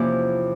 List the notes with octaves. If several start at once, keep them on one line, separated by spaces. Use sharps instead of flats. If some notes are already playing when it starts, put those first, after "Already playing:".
Already playing: E2 C3 F3 A#3 C#4 E4 G4